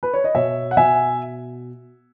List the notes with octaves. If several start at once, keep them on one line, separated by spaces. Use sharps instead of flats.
B4
C#5
D#5
B2 C#5 E5
F#5
B2 E5 G#5